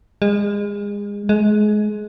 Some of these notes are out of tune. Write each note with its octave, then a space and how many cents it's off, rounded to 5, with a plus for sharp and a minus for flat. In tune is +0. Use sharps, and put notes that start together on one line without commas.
G#3 -30
G#3 +25